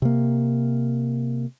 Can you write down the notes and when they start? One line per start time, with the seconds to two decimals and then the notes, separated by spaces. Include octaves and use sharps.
0.02 C3 A#3